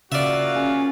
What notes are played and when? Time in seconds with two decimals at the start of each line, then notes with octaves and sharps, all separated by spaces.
0.12 C#3 A#3 F4 F#4 D5 E5
0.56 C#4 G#4